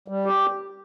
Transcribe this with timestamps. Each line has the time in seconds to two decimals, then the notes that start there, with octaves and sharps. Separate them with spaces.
0.08 G3
0.26 G4